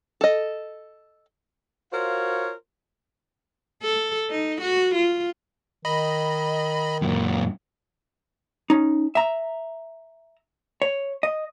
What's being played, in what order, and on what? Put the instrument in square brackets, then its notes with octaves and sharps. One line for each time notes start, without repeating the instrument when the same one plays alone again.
[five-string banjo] A4 D#5
[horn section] F4 F#4 A#4 C5 C#5 F5
[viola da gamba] A4
D#4
F#4
F4
[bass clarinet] D#3 [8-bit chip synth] D#5 B5
[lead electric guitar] F#2 A#2
[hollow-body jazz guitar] C#4 D#4
E5 A#5
C#5
D#5